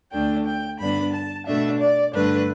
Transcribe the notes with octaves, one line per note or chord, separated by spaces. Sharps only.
D2 D3 A3 D4 G5
G5
G2 D3 B3 D4 B5
A5
B2 A3 D4 E5
D5
G2 D3 A3 D4 B4